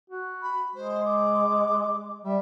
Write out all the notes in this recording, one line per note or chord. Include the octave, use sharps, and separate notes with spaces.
F#4
B5
G#3 C5
D6
G3 E5